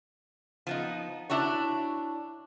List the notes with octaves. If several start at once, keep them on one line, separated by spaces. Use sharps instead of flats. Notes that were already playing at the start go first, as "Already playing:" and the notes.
F3 B3 D#4
D4 E4 F#4 C#5